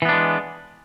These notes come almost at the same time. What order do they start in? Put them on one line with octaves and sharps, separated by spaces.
E3 B3 D4 G#3